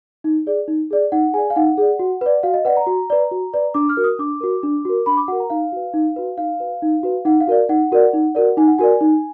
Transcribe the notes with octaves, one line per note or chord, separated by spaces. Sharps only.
D#4
G#4 D5
D#4
G#4 D5
D#4 F#5
G#4 D5 G#5
F5
D#4 F#5
G#4 D5
F#4
B4 D5
F#4 F5
D#5
B4 D5 F#5
A#5
F#4
B4 D5
F#4
B4 D5
D4 D6
F6
F#4 A#4
D#6
D4 D6
F#4 A#4
D4
F#4 A#4
D4 B5
D6
F#4 A#4 F#5
A#5
D#4 F5
F#4 B4
D#4
F#4 B4
D#4 F5
F#4 B4
D#4
F#4 B4
D#4 F#5
F5
F#4 A#4 D5
D#4 F#5
F#4 A#4 D5
D#4
F#4 A#4 D5
D#4 G#5
F#5
F#4 A#4 D5 G#5
D#4